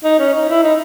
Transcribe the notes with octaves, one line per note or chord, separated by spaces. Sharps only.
D#4
C#4
D#4
E4
D#4